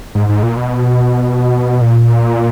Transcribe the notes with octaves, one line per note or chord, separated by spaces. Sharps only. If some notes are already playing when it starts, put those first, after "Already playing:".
G#2
G#2
A#2
B2
A#2